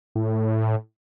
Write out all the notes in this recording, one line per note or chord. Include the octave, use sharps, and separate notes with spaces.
A2